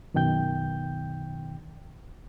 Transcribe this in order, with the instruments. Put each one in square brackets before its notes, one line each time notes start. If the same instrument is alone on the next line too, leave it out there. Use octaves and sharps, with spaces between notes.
[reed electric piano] F#2 B2 D#3 G5 G6